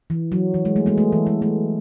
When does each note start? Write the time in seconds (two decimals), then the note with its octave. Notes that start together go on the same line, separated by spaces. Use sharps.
0.10 E3
0.32 F#3
0.54 E3
0.65 G#3
0.76 A3
0.86 G#3 B3
0.98 A3
1.12 E3
1.27 G#3
1.42 A3